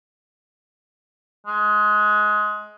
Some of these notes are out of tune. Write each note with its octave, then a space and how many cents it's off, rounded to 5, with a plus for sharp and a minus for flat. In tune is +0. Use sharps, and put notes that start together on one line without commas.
G#3 +20